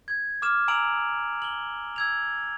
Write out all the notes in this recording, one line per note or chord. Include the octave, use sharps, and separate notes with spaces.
G#6
D6 F6 E7
G#5 A#5 E6 D7 F7 F#7
F#7 G7
E6 G#6 F7